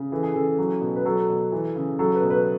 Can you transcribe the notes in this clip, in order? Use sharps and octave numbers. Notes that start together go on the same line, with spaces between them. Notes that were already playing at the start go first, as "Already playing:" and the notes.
Already playing: C#3
E3 A4
G#4
C#3 A4
F#3
B2
B4
F#3 A4
B2
E3
C#3
F#3 A4
B4
B2
B4